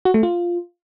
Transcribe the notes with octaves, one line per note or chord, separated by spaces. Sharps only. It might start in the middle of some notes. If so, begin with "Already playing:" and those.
F#4
A3
F4